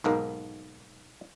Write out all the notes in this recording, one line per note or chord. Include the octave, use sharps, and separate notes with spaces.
B1 G#2 A#3 A#4